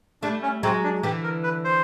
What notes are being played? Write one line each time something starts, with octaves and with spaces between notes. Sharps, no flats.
G3 A3 D4
C#4
F#3 G#3 C4
D4
D3 E3 G4
A#4
B4
C5